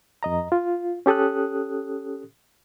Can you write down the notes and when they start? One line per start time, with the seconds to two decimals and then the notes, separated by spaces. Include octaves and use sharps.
0.23 F2 D#5 A#5
0.52 F4
1.06 C#4 G4 A4 D#6 F#6